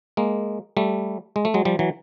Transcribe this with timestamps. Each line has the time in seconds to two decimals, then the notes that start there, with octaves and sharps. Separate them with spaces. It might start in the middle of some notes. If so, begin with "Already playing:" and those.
0.17 G#3 A#3
0.77 G3 A3
1.36 G#3
1.45 A3
1.54 F#3 G#3
1.65 F3 G3
1.79 E3 F#3